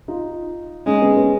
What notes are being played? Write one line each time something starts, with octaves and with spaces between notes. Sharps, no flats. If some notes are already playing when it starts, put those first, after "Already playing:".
D#4 F4
G#3 C#4 D#4
B3 C#4
B3 C#4